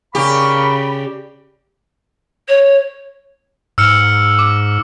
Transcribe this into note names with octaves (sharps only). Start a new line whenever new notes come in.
C#3 G4 A#4 D5 F5 B5 C#6
C#5
G#2 E6 F6 C#7
D6